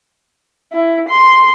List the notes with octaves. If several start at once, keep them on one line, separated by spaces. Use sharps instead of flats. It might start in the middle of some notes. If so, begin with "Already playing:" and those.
E4
C6